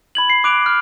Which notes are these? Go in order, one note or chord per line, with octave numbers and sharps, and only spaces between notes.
B5 G#6 F#7
C7
D6 F#6 D7 F7
F6